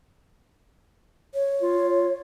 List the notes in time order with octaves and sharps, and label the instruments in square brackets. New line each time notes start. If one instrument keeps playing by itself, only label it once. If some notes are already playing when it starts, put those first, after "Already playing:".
[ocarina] C#5
[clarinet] F4